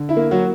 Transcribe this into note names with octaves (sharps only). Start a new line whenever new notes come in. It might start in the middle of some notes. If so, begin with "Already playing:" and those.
Already playing: D3
E4
A#3
F#3 F#4